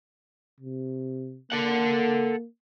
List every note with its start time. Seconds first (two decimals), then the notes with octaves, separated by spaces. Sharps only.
0.61 C3
1.52 A#3 A4 F#5